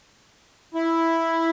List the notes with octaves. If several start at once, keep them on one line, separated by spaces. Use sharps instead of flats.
E4